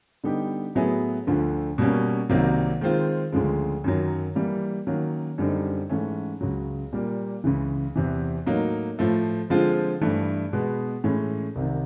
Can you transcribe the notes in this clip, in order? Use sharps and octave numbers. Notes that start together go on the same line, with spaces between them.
D3 G3 B3 D#4 G4
A2 F#3 B3 E4 G#4
D2 D3 F3
B2 G3 A#3 C#4
C2 C3 D#3 F#3 A#3
D#3 G#3 C4 F4
D2 C#3 F3 G#3
F#2 D#3 F#3
E3 G3 A#3
D#3 F#3 A#3 C#4
F#2 D3 G3 C4 D#4
G#2 E3 A3 C#4
C#2 C#3 F#3
A#2 G3 A#3
C#2 C#3 E3
E2 C3 E3
A2 F#3 A#3 D#4
A2 F3 A3
D3 F3 G#3 C4 F4
G2 E3 A3
B2 G#3 B3
A2 E3 G#3 C#4
C2 C3 D#3